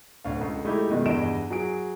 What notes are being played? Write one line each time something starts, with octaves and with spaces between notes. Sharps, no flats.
D1 D2 F5
C#2
G#3 A3 D#4 E4 G4
F#2 B2 D#3 G#3
E2 G2 G#4 D#5 D7 E7
F#3 G#4 D7